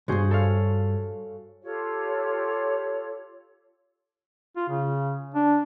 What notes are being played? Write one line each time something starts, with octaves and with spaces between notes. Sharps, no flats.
B1 G2 F#4 G#4 C5
A4 C#5 F5
F4 G4 A4 C#5
F4
C#3
D4